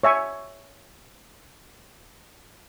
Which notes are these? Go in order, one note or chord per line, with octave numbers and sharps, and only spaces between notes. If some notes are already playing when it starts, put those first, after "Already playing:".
C#5 E5 G#5 C#6